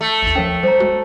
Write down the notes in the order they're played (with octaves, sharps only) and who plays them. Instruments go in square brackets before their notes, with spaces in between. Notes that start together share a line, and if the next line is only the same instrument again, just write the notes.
[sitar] A3
[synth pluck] G#1 D#2
[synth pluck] F3 C#4 [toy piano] A#4 C#5 G5
[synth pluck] G3 [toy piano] C5 A#5
[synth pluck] G#3 F#4